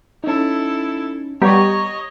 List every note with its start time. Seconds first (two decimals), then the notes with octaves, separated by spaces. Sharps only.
0.24 C#4 D#4 E4 A4
1.42 G3 B3 G4 C#5 D#5 A#5 C#6